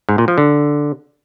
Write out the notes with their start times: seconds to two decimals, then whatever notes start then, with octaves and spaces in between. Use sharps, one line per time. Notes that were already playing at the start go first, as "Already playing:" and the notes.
0.09 G#2
0.18 A#2
0.28 F3
0.38 D3